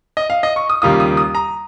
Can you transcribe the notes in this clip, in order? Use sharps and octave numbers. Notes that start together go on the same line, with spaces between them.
D#5
F5
D#5
C#6
D#6
D#2 C#3 G3 A#3 F4 D#6
D#6
D#6
A#5